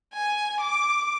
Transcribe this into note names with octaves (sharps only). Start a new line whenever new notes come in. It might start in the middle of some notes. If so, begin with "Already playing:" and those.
G#5
D6